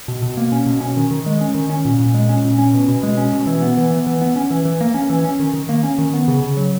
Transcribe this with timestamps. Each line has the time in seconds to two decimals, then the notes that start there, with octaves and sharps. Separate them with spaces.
0.08 B2
0.22 B2
0.37 A#3
0.52 C#4
0.66 B2
0.81 C#4
0.97 D#3
1.11 D#3
1.26 G#3
1.41 C#4
1.55 D#3
1.70 C#4
1.85 A#2
2.00 A#2
2.14 G#3
2.29 C#4
2.44 A#2
2.58 C#4
2.74 B2
2.88 B2
3.03 G#3
3.17 C#4
3.33 B2
3.47 E3
3.62 B3
3.77 E3
3.91 B3
4.07 E3
4.22 B3
4.36 C#4
4.50 E3
4.65 E3
4.81 A#3
4.94 C#4
5.10 E3
5.24 C#4
5.39 D#3
5.53 D#3
5.69 A#3
5.83 C#4
5.98 D#3
6.14 B3
6.28 C#3
6.42 C#3
6.57 F#3